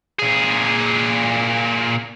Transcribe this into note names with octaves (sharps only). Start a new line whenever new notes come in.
A#2 G#4